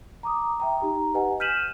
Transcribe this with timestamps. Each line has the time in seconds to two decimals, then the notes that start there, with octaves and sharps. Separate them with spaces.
0.23 A#5 D6 D#6
0.60 E5 G5 A#5
0.81 D#4 G4 A#5
1.14 G4 B4 D#5 F#5 G#5
1.40 F6 G6 B6 D#7 E7 F#7